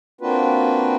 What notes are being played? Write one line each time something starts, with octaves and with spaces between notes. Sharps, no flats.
A#3 C4 D4 F4 F#4 B4